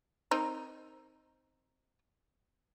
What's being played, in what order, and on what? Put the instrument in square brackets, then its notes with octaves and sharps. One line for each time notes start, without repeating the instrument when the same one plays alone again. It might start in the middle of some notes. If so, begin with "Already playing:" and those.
[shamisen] C4 D#4 A#4